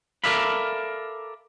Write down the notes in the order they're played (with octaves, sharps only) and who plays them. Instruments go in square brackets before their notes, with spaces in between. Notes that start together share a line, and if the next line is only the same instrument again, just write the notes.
[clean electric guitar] A4 A#4 D5 E5 F5 B5